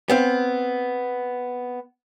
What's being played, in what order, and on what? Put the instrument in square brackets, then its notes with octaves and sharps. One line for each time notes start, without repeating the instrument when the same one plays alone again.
[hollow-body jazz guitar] B3 C4 F5